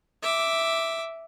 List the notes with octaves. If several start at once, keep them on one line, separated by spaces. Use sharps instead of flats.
E5 D6